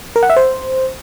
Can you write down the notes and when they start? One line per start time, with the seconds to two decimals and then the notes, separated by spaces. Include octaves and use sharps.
0.16 A#4
0.23 F#5
0.30 E5
0.37 C5